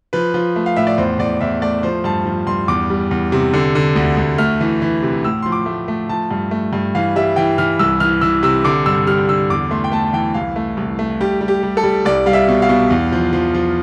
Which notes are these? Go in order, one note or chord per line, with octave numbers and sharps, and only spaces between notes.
F3 B4
F3
A3
F5
A2 E5
D5
E2 C5
E2 D5
E2 E5
A3 D5
F3 C5
G2 A5
F3
G2 C6
E2 D6
G3
E2
C3
D3
D3
D2
D2
A3 F6
E3
E3
C3
A2 E6
F3 C6
D6
A3
A3
F3 A5
G2
A3
G2
E3 F5
G3 E5
E3 G5
E3 F6
C2 E6
E3 F6
E3 E6
C3 E6
D3 D6
G2 E6
G3 F6
D3 E6
E2 D6
A3 C6
G5
A3 A5
E3 G5
C2 F5
A3
C2
A3
G3 G4
G3
G4
G3
A4
G3
C2 D5
G3 F5
E5
B2
F5
B2
E2
F3
F3
F3